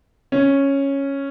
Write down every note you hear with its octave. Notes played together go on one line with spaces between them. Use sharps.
C#4